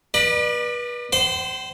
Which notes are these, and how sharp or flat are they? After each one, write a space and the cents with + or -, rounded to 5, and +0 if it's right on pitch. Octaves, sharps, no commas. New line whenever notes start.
B4 -30 D5 +35 B5 +0
C5 +0 G5 -45 C6 -40